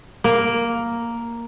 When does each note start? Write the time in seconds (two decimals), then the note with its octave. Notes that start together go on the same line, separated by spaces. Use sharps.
0.24 A#3